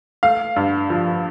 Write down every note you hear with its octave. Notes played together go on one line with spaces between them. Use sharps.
A3 F5
G2
F3